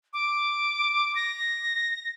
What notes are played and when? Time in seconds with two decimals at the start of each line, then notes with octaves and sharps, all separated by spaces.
0.13 D6
1.16 A#6